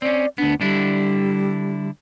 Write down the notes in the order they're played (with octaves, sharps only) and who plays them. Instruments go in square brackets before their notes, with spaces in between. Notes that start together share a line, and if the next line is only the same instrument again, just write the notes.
[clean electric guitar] C4 C#4 [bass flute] D5
[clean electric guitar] D2 B3 [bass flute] D4
[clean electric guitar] D3 D4 E4 [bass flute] G3